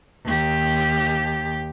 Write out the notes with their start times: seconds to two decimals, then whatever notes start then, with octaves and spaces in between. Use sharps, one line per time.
0.24 D#2 G4